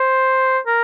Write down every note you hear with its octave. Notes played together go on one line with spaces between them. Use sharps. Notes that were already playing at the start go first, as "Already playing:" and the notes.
Already playing: C5
A#4